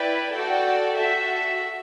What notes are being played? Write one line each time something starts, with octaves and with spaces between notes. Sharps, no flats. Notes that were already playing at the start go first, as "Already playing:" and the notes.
Already playing: E4 B4 D5 G5
F#4 A4 D5 G5
F#4 A4 E5